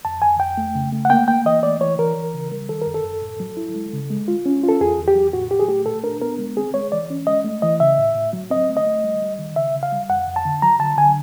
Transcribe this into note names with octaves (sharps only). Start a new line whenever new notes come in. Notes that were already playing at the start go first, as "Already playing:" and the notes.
F2 A5
F2 G#5
F2 G5
A3
C#3
A3
F#5
A#3 G5
A#3 G5
E3 D#5
A3 D5
E3 C#5
E3 A#4
E3
C#3
G3
D#3 A4
F#2 A#4
A4
F#2
A2
F#3
E4
G#3
C#3
G#3
F4
C#4
F4
A4
E2 G#4
E2
G4
F#3
A2 F#4
A2 G4
G#4
A3 G4
A#2 A4
D4 A#4
B3 A#4
G#3
C4 G#4
G#3 C#5
E3 D5
C#4
G#3 D#5
A3
E3 D#5
C#3 E5
A2
A2
F#3
C4 D#5
A3
D#5
A3
G3
G3
D#3
C#3 E5
C#3
F5
G3
F2 F#5
F2
A5
D3
F#3 A#5
D3 A5
D3 G#5